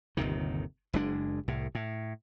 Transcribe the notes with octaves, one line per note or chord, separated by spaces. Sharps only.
G1 D#2 C3 D#3
F#1 G#3 D4
C2 A2
A2